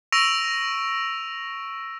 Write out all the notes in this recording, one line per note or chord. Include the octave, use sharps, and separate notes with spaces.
C#6 E6 A#6 D7 D#7 F7